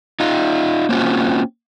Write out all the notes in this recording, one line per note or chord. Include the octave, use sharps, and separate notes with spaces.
D#4 F4
A#3 C4 C#4 F4 F#4